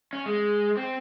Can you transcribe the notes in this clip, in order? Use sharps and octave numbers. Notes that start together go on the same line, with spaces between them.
C#4
G#3
C4